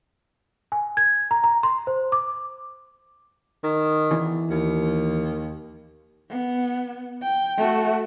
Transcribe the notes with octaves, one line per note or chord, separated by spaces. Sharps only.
G#5
G#6
A#5
A#5
C6
C5
D6
D#3
E2 E3
D#2
B3
G5
A3 F#4